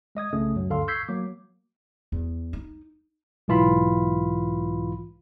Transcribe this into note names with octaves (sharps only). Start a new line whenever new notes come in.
G#3 D#5 D#6 G#6
C2 C#3 A3 C#4 D#6
F#2 F#3
D2 G2 D3 A4 F5 C6
C#6 E6 G6 G#6 B6 C7
F#3 A#3 D6
E2
D#4
B1 G#2 E3 F4 F5 B5